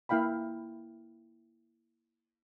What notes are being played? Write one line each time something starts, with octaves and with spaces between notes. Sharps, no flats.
A#3 E4 F5 G5 B5